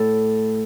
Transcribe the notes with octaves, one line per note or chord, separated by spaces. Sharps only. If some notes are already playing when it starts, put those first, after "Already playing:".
Already playing: A2 A4